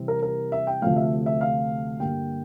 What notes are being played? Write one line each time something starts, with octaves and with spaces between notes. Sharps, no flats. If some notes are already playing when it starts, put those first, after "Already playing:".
Already playing: C3 E3 G3 C4
A#4
A#4
E5
G5
D2 C3 F3 A3 F5
E5
E5
F5
G2 D3 G3 A#3 G5